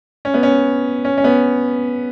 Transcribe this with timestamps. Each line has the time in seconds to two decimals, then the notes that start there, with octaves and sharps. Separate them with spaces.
0.25 C#4
0.34 B3
0.43 C#4
1.05 C#4
1.18 C#4
1.24 B3